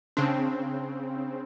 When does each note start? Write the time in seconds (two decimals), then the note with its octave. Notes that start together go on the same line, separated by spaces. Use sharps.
0.17 C#3 C4 D4